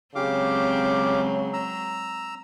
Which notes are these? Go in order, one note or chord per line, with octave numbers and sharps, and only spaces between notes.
C#3 F#3 G#3 C4 G4 F5 D6
A#5 E6